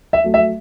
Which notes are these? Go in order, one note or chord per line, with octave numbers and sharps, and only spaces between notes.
E5
F#3 A3
E5